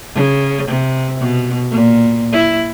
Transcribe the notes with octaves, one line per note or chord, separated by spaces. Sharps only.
C#3
C3
B2
A#2
E4